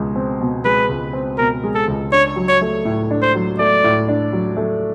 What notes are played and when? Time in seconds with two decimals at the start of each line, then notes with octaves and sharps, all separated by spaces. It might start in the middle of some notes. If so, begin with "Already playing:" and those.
Already playing: C#2 B2 G#3
0.16 C4
0.41 B2
0.65 G#3 B4
0.89 C#2
1.13 C4
1.38 B2 A#4
1.64 G#3
1.75 A4
1.88 C#2
2.12 D4 C#5
2.36 F#3
2.48 C#5
2.61 A3
2.85 A2
3.11 D4
3.22 C5
3.35 F#3
3.59 A3 D5
3.84 A2
4.08 D4
4.33 F#3
4.57 A3